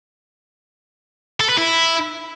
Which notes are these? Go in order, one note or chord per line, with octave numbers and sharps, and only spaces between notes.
A4
B4
E4